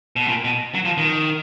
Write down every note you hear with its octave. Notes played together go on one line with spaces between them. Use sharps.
B2
A#2
B2
F#3
F3
D#3